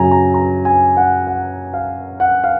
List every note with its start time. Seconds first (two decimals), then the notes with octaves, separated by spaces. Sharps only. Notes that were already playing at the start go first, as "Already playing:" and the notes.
Already playing: F#2 C#3 F#3 G#5 A#5
0.11 A#5
0.34 A#5
0.65 G#5
0.97 F#5
1.27 F#5
1.73 F5
2.20 F#5
2.44 F5